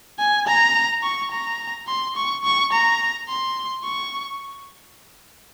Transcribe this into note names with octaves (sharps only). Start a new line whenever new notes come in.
G#5
A#5
C#6
A#5
C6
C#6
C#6
A#5
C6
C#6